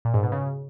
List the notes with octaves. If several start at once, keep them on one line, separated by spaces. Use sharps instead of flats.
A#2
G#2
B2
C#3